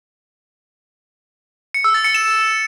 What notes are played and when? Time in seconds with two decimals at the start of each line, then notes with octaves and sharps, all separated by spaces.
1.74 C#7
1.84 E6
1.94 A6
2.04 C#7
2.14 E7